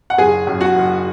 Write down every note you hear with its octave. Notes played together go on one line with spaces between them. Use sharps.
F#5
F#1 G#4 G#5
F#2
F#4 F#5
F#1